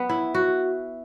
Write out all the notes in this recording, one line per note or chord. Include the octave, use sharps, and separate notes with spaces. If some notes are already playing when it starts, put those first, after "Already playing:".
Already playing: B3
E4
F#4